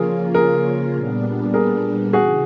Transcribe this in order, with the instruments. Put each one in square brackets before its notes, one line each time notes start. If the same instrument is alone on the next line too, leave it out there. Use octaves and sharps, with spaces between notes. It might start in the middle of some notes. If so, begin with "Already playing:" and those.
Already playing: [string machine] C#3 F3 A#3 C#4 F4 [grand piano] G#4 A#4
[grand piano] G#4 A#4
[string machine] A#2 G3 B3 D4
[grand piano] G#4 A#4
[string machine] C#3 E3 [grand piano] F#4 G#4